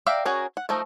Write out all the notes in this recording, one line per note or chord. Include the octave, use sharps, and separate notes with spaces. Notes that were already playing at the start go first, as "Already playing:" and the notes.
D5 E5 F5 G5 A#5
C#4 F#4 G#4 A#4
F#5
F3 A3 D#4 A#4